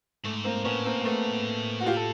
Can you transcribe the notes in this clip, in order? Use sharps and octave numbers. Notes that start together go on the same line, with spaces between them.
G#2 A3
A#3 C4
A2 B3 C#4
A#3 C4
A#3
A3 B3
F#4
F4 G4
A4